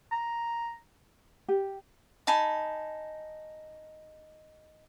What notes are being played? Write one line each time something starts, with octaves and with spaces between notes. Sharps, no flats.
A#5
G4
D#4 G#5 A5 B5